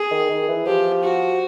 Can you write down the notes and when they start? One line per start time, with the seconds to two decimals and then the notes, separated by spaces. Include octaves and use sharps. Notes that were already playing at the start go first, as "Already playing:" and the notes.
Already playing: G#4
0.11 D#3
0.30 D#3
0.48 E3
0.66 F3 G4
1.03 F#4